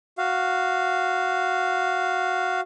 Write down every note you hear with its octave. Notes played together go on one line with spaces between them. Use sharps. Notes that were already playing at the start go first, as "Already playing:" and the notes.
F#4 F5